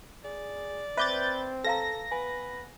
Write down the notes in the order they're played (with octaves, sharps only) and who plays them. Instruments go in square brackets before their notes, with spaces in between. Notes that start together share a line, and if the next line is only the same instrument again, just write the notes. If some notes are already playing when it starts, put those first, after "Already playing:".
[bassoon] G#4 [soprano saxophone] D5
[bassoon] C4 [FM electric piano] B4 G6 A6 [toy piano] E5 D6
[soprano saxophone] A4 [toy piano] B4 F5 A#5 [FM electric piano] A#6
[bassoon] B3 [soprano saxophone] B4 [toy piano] G#5